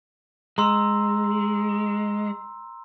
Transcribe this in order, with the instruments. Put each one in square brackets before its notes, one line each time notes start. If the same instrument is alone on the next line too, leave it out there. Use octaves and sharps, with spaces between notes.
[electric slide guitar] G#3 [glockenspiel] A#5 C6 E6